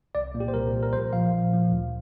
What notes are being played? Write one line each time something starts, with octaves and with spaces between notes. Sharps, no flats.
C2 D5
A#2 A#3
G4
C5
C2 A#4
A#2 A#3
A#4
A#1 C5
A#2 F3 F5
A#1
A#2 F3
D2